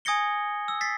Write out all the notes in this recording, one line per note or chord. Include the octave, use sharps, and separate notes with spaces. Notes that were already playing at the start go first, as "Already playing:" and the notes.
G#5 D#6 G#6 A#6 C#7 G7
E6
E6 A6 B6 C7